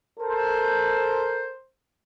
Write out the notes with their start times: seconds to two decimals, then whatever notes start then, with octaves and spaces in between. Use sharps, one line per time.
0.20 A4 A#4 C5